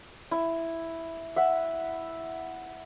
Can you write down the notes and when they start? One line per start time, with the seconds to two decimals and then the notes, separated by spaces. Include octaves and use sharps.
0.31 E4
1.36 E5 F#5